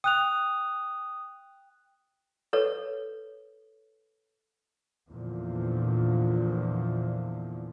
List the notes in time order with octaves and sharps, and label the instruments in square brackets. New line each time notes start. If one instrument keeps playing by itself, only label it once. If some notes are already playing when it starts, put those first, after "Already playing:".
[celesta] G5 F#6 F7 [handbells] D#6
[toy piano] A4 B4 C#5
[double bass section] E2 A#2 D3 F3